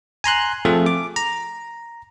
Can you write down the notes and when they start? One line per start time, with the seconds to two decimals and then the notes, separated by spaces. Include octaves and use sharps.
0.24 G#5 A#5 C6 F#6
0.65 F3 A3 C4 G#4 A4
0.86 D6
1.16 A#5